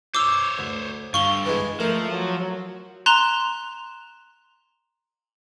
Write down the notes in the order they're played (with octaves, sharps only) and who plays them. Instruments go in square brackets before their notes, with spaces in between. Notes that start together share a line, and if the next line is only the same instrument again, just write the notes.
[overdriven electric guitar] C5 C#5 [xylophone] D6 E6
[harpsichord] D2
[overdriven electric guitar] G2 D3 [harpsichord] F5 [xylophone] C#6 G7
[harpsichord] E3 G#3
[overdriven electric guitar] F3 [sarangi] A3 [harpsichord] A#4
[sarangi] F#3
[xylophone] A#5 C6 F#6 E7 F7 G7